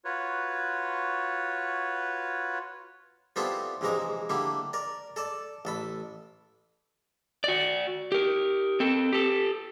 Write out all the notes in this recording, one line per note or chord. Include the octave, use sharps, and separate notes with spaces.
F4 F#4 B4 C#5
G3 B3 C4 E4 F4 A4
A#1 C3 E3 G#3 A#5 D6
D3 G3 A#3 E4
A#4 D5
A4 D5 A5
A1 A4 B5
F#4 D5
G4 A#4
C4 A4
G4 A4